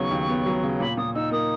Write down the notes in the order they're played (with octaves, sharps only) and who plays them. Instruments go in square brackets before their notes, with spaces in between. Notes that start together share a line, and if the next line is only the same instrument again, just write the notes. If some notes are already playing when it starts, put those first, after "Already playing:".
Already playing: [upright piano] D#2 C#3 F#3 B3 [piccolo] C#6
[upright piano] D#2
B3
F#3
C#3
[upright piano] A#2 [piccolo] B5
[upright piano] A#2 [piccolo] D#6
[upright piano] D#4 [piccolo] E6
[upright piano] A#3 [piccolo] D#6